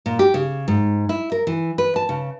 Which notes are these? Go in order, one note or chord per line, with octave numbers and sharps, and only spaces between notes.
A#2
G4
C#3
G#2
E4
A#4
E3
B4
A5
C#3